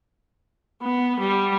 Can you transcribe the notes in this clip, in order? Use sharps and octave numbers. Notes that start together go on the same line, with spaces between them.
B3
G3